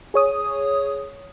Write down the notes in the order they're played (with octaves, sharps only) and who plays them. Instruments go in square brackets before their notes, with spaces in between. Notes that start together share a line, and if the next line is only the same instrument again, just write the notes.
[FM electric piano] G#4 C#5 D#6